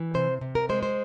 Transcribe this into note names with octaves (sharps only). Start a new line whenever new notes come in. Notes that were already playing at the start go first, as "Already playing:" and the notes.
Already playing: E3
C3 C5
C3
A#4
G#3 C5
C5